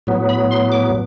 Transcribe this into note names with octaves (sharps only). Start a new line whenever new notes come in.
A2 F#3 B3
B5
C6
D6